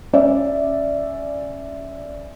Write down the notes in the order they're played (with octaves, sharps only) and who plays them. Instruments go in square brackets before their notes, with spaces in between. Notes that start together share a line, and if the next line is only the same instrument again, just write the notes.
[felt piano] C#4 D5 E5